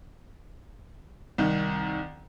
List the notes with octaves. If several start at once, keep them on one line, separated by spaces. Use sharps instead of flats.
C2 D#3